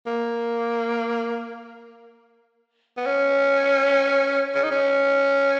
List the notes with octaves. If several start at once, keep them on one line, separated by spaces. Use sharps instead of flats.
A#3
B3
C#4
C#4
D#4
C#4